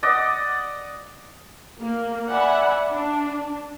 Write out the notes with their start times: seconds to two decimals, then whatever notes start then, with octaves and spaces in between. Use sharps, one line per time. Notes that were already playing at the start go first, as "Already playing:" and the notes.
0.03 D5 D#5 F#5
1.81 A#3
2.30 D5 E5 F#5 G#5 B5
2.92 D4